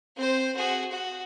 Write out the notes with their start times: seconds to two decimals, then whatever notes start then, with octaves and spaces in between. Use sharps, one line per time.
0.16 C4 C5
0.56 F#4 G#4
0.91 F#4